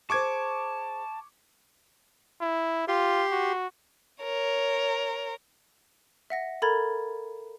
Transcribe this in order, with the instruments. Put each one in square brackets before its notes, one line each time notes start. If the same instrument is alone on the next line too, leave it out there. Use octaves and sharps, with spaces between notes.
[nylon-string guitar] G#4 C5 [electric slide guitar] A5 [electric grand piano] C#6 D6 G#6
[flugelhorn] E4
[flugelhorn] F4 [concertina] G4 C6
[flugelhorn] F#4
[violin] A#4 C#5
[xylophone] E5 F#5 A#6
A4 A#4 A#5 B5 G#6 A6